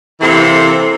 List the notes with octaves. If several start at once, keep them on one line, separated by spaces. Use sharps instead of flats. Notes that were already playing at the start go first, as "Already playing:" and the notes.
C3 E3 A#3 C4 E4 A4